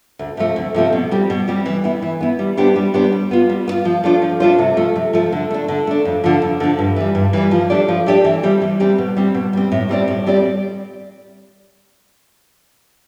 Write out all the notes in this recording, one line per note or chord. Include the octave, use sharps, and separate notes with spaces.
D2
C3 F3 A3 C4
D2
C3 F3 A3 C4
B2
G3 C4 G4
B2
G3 C4 G4
E3
B3 E4
E3
B3 E4
G3
B3 D4 G4 C5
G3
B3 D4 G4 C5
G3
B3 F4
G3
B3
F4
F3
A3 D4 F4 C5
F3
A3 D4 F4 C5
C3
F3 A3
C3
F3 A3
D3
A3 D4
D3
A3 D4
F2
D3 F3
F2
D3 F3
G2
E3 G3
G2
E3 G3
F3
A3 D4 G4 D5
F3
A3 D4 G4 D5
E3
G3 C4 G4
E3
G3 C4 G4
B2
G3 C4
B2
G3 C4
A2
G3 C4 G4 D5
A2
G3 C4 G4 D5